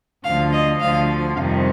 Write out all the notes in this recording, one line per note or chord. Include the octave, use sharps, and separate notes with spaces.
D2 D3 F3 F5
D#5
D2 D3 F3 F5
F2 C3 D#3 G3 F5